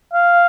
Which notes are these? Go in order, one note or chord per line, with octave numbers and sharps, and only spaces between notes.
F5